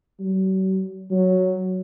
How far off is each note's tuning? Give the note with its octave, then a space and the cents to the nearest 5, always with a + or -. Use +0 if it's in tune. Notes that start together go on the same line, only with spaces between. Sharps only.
F#3 +45
F#3 +0